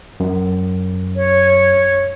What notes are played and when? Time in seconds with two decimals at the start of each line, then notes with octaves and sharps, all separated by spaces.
0.20 F#2
1.16 C#5